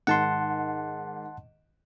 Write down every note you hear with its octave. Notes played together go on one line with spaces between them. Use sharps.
G#2 D#3 F#5 A5 C6